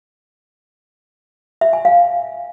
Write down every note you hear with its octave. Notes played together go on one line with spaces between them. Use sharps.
E5
G#5
F5